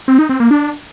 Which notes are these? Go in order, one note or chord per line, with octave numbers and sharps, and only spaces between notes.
C4
D#4
C4
A#3
D4